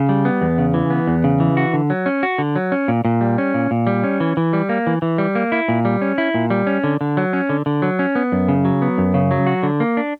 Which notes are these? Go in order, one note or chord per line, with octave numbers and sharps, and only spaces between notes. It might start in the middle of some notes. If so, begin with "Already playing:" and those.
Already playing: C#3
G3
B3
E2
C#3
E3
B3
E2
C#3
E3
F#4
D3
F#3
C#4
F#4
D3
F#3
C#4
A#2
A#2
G3
C#4
A#2
A#2
G3
C#4
E3
E3
G3
A#3
E3
E3
G3
A#3
E4
A#2
G3
C#4
E4
A#2
G3
C#4
D3
D3
F#3
C#4
D3
D3
F#3
C#4
B3
F#2
C#3
F#3
B3
F#2
C#3
F#3
F#4
D3
A#3
D4